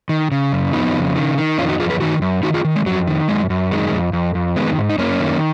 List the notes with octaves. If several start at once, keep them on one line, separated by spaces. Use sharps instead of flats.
D#3
C#3
F#2
F2 B3 D#4
C#3
D#3
D#3
F2 C#4 F4
D#4 F#4
F2 F4 G#4
G#4 B4
D#3 D#4 F#4
F#2
D#3 D#4 F#4
F4 G#4
D#3
G#3
F2 F#3
D#3
F#2 G#3
F#2
D#3 G#3
F2
F2
F2
D#3 G#3 B3
G#2
D#4
F#2 A#3 C#4
D#3